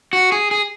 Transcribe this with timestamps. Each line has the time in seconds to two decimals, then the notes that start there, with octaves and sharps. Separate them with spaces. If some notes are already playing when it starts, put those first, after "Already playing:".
0.13 F#4
0.32 G#4
0.51 G#4